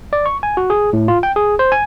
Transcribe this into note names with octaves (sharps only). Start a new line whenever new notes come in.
D5
C#6
G#5
F#4
G#4
A2
F4
G5
G#4
C5
G#5